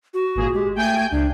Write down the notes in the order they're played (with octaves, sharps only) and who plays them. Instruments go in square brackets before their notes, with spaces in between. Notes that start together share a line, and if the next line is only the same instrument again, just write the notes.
[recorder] F#4
[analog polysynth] G#1 A#2 G#4
[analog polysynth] G#3 [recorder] G4
[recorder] A3 [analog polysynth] G5 G#5 G6
[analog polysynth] C#2 [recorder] D4